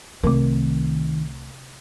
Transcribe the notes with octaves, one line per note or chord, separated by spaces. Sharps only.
C2 C3 D#3 A3 C4 A#4